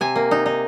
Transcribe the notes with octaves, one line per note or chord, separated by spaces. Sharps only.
C3 G#5
A#3
D#4
D#4